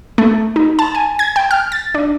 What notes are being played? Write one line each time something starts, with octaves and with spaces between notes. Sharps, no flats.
A3
D#4
A5
G#5
G#6
G5
F6
A6
D4